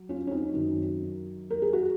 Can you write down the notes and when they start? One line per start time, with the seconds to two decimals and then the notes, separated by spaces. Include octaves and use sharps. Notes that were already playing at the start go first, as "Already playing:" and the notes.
Already playing: F#3
0.09 C#4 F4
0.27 C#4
0.31 C4 D#4
0.53 F#2 D#3 F#3
1.50 A#4
1.62 G#4
1.73 F#4